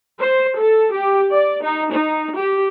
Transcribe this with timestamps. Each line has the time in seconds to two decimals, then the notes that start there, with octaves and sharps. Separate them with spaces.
0.19 C5
0.56 A4
0.91 G4
1.31 D5
1.63 D#4
1.92 D#4
2.36 G4